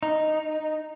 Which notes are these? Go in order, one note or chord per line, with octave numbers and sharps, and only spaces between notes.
D#4